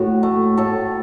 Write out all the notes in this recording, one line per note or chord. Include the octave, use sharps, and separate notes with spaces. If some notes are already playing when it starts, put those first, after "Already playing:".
Already playing: A2 F#4
A3
A2 A4